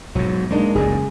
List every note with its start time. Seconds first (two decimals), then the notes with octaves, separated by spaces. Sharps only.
0.15 B1 G#2 F#3
0.51 G#3 A#3 D4 D#4
0.75 F#1 C#2 F#2 G#4